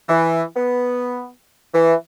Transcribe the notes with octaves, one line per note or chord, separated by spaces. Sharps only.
E3
B3
E3